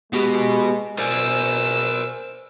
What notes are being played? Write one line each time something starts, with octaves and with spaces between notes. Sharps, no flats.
G#3 B3 F#4 G4
B2 A#4 C5 D5 G#5 E6